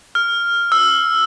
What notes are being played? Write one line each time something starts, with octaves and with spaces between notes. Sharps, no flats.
F6
E6